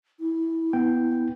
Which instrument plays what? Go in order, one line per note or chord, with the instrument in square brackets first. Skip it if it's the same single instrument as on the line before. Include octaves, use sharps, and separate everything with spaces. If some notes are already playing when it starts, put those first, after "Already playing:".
[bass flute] E4
[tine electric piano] B3 G5